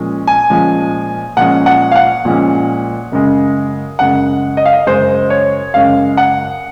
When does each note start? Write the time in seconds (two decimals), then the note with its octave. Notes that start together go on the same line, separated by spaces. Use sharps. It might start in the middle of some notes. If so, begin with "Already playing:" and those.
Already playing: A#2 F3 G#3 C#4
0.27 G#5
0.50 A#2 F3 G#3 C#4
1.37 A#2 F3 G#3 C#4 F#5
1.66 F#5
1.91 F5
1.95 F#5
2.25 A#2 F3 G#3 C#4
3.12 F#2 C#3 G#3
3.99 F#2 C#3 G#3 F#5
4.57 D#5
4.66 F5
4.73 D#5
4.87 F#2 C#3 G#3 C5
5.30 C#5
5.74 F#2 C#3 G#3 F5
6.17 F#5